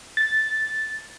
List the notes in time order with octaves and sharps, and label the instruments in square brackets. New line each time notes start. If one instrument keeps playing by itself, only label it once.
[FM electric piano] A6